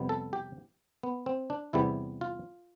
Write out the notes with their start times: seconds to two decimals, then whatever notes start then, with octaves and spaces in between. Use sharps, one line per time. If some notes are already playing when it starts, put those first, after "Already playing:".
Already playing: F2 C3 G3 B3
0.09 A4
0.33 G4
1.03 B3
1.26 C4
1.50 D4
1.73 E2 C3 G3 B3 E4
2.21 F4